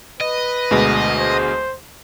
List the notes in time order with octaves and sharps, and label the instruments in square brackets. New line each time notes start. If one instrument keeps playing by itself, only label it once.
[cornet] B4 [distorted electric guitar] D#5
[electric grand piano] D2 B2 G#3
[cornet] C5